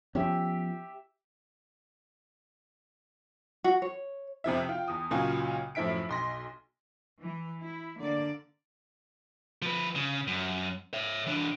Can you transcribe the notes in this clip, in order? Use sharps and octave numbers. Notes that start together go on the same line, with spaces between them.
F3 B3 C#4 G4 E5
F#4
C#5
F2 C3 F3 E5
F4 G5
E2 D#6
C#2 A#2 F#3 C#4 F4 G#5
F#2 A2 F3 E4 B6 D7
B1 C6 A#6
E3
E4
D3 A#3 D5
F3 B4
C#3
F#2
C#5 E5
E3 D4